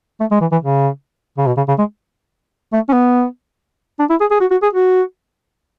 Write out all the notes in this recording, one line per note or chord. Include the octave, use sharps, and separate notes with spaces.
A3
G#3
E3
E3
C#3
C#3
B2
C#3
C#3
G#3
A3
C#4
B3
D4
E4
G#4
G#4
F#4
F#4
G#4
F#4